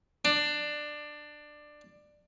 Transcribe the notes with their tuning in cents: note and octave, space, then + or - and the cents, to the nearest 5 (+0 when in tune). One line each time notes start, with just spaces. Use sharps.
D4 +15